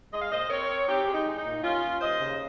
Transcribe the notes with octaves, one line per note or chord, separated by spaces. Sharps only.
G#3 D#5
F5
A#2 C5 D#5
C4 A#4 C#5
C4
C4 D#4 G4
G#3
D#4
G#3
D#4
A#2
D#2 C#4 F4
D#2
D#2 C5 D#5
C#3